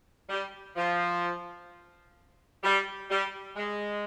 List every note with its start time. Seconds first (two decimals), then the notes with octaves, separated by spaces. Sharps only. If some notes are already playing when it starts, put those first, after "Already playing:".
0.29 G3
0.76 F3
2.63 G3
3.10 G3
3.56 G#3